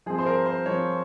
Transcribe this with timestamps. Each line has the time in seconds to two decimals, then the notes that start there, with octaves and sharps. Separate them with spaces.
0.06 F3 C4 G#4
0.19 C5
0.26 A#4
0.46 C5
0.66 F3 C4 C#5